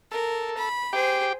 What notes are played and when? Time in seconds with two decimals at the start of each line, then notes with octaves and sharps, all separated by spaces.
0.12 A4 A#4
0.57 B5
0.93 G4 G#4 C5 G5